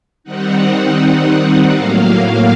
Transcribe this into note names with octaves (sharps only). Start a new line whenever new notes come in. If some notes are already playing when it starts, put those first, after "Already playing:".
D#3 G3 C4 D#4 F#5
A2 F#3 A#3 F5